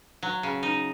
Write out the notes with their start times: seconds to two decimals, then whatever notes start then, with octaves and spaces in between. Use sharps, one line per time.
0.23 F#3
0.43 C#3
0.63 D#4